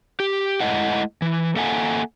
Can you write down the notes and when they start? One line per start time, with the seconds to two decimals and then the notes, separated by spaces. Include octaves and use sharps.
0.20 G4
0.61 G#3 A3 E4 D#5 F#5
1.22 E3
1.56 A#3 A4 E5 F#5 G#5